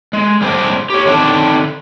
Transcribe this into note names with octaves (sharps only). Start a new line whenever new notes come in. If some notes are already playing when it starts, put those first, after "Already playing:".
G#3
G3 G#3 C4 D4 C5
G4 C#5
D3 D#3 C4 D4 A5